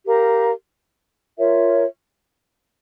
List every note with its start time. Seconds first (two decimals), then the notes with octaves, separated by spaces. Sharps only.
0.05 G4 A#4 F5 A#5
1.38 F4 A#4 C#5 E5